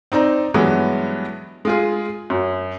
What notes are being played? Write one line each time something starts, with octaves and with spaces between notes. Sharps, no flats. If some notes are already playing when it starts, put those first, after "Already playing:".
C4 D#4 D5 A#5
G2 E3 F#3 G#3 B3
G#3 F4 G#4
F#2